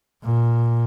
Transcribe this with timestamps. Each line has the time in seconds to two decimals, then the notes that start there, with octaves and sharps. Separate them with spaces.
0.24 A#2